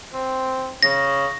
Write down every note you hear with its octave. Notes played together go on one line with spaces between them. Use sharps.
C4
C#3 A#6